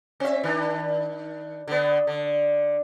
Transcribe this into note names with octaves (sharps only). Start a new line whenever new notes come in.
C4 E5
D#3 D4
D3 B3
D3